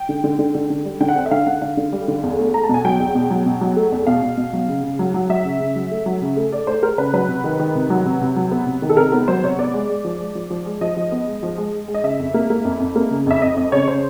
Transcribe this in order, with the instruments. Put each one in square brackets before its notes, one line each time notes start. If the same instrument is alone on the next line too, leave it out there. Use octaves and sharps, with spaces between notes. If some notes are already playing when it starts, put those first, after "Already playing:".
Already playing: [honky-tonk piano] G5
D3
D3
D3
D3
D3
G3
D3 G5
F#5
C4 G5
E5
D3 F5
D3 F#5
D3 F5
D3
G3
D3
E2
A3
A3 A#5
A5
B2 G#5
F#3 G5
E2
B2
F#3
B2
F#3
A3
E2
B2 F5
B2
B2
F#3
C#3
C#3
F#3
F#3
F#3 E5
C#3
C#3
F#3
A3
F#3
C#3
A3
A3 D5
A3 C5
A3 A#4
C#3 B4
F#3 B4
C3
D#3
D#3
C3
F#3
C3
C3
F#3
B3
C3
D#3
A4
C3 A#4
B3 A#4
F#3 C5
C3 C#5
B3 D5
G#3
G#3
F3
G#3
F3
F3
G#3
F3 D#5
F3
B3
G#3
F3
G#3
G#3
G#3
D#5
C#3 E5
F2
A#3
A#3
F2
F2
A#3
C#3
F2 E5
F2 D#5
F2 D#5
C#3 C#5
C#3 C5